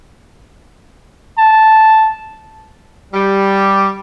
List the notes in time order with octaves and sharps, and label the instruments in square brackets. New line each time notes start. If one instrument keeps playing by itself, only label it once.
[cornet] A5
[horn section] G3